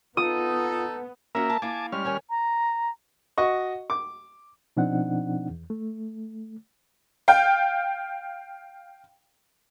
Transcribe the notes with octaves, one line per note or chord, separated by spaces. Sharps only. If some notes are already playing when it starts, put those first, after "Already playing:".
B3 D#4 F4 A4 D#6
A#3 C#4 F#4 A#4 E5
A5
A#3 E4 G#5 A5 D6
G3 G#3 C#4 F6
D#3 C#5 G#5
A#5
F#4 D#5 C#6
D6
B2 F3 C4 D4 D#4 F#5
E2
A3
F5 G5